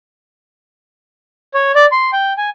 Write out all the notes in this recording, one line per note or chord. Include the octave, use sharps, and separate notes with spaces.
C#5
D5
C6
G5
G#5